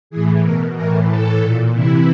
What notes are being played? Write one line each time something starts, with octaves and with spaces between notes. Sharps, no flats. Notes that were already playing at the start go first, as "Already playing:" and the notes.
A2 E3 G#4
B2 A#4
A2 E3 A#4
A2 E3 A4
A#2
C3 E3 E4